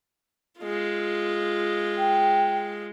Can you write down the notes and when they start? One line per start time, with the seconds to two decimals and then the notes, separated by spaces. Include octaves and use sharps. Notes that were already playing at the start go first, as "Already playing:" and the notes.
0.61 G#3 F4
1.97 G5